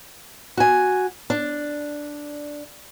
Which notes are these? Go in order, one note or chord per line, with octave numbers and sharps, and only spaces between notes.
F#4 G#5
D4